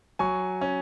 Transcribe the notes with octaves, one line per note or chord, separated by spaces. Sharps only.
F#3 G#5 C#6
C#4